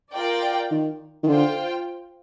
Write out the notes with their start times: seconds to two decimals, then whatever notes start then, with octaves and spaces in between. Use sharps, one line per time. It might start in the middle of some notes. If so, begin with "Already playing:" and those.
0.14 F4 A#4 D5 G5
0.71 D#3
1.23 D#3
1.28 D3 F4 C5 G5